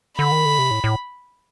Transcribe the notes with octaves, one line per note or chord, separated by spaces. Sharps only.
D3 B5
D#3
D3
C3
A2
A2